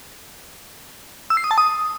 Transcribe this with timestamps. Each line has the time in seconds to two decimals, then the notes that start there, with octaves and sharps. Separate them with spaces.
1.30 E6
1.37 C7
1.44 D#6
1.51 A5
1.58 D#6